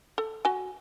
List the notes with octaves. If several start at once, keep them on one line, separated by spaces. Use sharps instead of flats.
A4
F#4 G#5